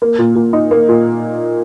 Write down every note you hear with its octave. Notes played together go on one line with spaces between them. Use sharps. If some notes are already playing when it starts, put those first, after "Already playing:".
A#3
A#2
A#2
D#4
A#3
A#2